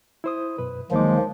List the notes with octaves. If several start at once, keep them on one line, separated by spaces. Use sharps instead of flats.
E4 C5 D#6
F#2 B2 B4
D2 D#3 F3 F#3 G#3 A#3 D#4 D6